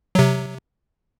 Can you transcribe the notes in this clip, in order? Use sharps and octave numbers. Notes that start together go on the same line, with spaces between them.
C3 F#3